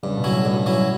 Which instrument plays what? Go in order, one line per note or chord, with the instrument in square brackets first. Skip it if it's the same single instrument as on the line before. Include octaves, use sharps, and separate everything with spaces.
[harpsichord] G2 [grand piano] C#3
[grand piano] B2
[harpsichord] F#3 C#4 E4
[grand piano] A2
[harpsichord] G2
F#3 C#4 E4